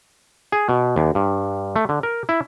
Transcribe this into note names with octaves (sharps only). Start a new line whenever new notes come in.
G#4
B2
D#2
G2
A3
D3
A#4
E4